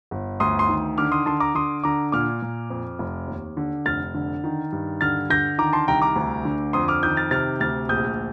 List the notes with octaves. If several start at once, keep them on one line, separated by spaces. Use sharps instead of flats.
G1
D2 C6 D#6
C6 D#6
D#3
D3 D6 F6
C6 D#6
D3 A5 C6
A#5 D6
D3 C6 D#6
D3 A#5 D6
A#2 D6 F6
A#2
F2
F1
D#2
D3
F1 F6 A6
D3
D#3
G2
D3 F6 A6
D3 G6 A#6
D#3 A#5 D6
A5 C6
C2 G5 A#5
A#5 D6
D2
D3
F2 C6 D#6
D6 F6
D#3 D#6 G6
F6 A6
C3 F6 A6
D2 F6 A6
A#1 D#6 G6